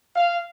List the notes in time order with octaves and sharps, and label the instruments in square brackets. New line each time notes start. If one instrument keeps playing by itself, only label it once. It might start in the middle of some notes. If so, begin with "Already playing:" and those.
[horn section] F5